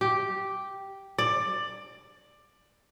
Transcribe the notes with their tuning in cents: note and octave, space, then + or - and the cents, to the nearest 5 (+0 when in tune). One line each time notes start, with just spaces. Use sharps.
G4 -5
D5 +15